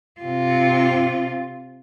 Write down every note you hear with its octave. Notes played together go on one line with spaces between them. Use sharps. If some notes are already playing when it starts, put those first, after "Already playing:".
C3 F4